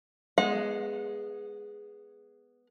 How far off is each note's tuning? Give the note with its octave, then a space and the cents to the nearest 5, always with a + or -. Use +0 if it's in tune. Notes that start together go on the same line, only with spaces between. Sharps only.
G#3 +0 B3 +0 F#5 -35